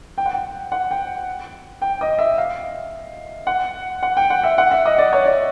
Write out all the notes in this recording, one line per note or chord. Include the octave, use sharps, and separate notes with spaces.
G5
F#5
G5
F#5
G5
G5
D#5
E5
F5
F#5
F#5
G5
F#5
E5
F#5
E5
D#5
D5
C#5
D5